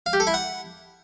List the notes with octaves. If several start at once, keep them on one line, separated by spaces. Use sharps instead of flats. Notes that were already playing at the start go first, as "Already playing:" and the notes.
F5
G4
A4
E4
F#5